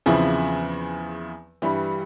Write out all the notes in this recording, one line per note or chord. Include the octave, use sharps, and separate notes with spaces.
E2 C#3 F3 C4 E4
G2 E3 G3